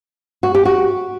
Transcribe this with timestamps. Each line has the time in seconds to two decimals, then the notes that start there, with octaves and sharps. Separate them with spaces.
0.43 F#4
0.55 G4
0.65 F#4